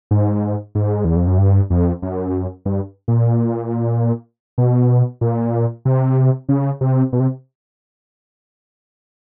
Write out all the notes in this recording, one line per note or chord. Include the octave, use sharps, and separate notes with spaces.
G#2
G#2
E2
F2
F#2
G2
F2
F#2
G2
A#2
B2
A#2
C3
C#3
C3
B2
C3